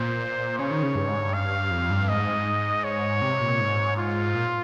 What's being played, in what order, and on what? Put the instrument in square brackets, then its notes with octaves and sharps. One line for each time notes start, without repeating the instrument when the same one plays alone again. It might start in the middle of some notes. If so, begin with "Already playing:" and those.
Already playing: [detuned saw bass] A#2 [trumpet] C5
[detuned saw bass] C#3 [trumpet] C#5
[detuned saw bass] D#3
C#3
G2
G#2
G2
[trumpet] F5
[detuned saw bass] F2
G2
[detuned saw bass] G#2 [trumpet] D#5
[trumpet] C#5
[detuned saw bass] C3
A#2
G#2
[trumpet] F4
[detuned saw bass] A#2